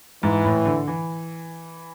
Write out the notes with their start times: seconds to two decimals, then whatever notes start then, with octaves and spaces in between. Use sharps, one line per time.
0.23 G#2 E3
0.45 A2
0.66 D3
0.87 E3